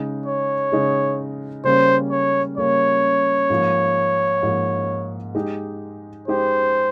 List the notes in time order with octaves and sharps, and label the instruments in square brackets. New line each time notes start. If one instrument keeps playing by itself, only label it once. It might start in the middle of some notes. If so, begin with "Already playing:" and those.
Already playing: [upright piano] C#3 G#3 D#4
[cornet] C#5
[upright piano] C#3 G#3 D#4
[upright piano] C#3 G3 A#3 C#4 [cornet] C5
[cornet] C#5
[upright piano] C#3 G3 A#3 C#4 [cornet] C#5
[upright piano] G#2 F3 A#3
G#2 F3 A#3
G#3 D#4 G4
[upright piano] G#3 D#4 G4 [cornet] C5